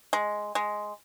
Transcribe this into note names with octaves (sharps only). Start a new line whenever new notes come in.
G#3
G#3